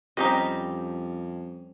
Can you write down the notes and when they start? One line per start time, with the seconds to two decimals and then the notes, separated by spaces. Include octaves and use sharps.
0.17 F2 G3 C4 C#4 D#4 G4 D#5